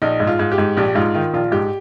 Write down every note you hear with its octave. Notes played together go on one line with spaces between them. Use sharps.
A#1 D#4
G#2
F4
G#2
G4
G#2
A#1 G4
G#2 F4
D#3 F4
A#1 F4
G#2 G4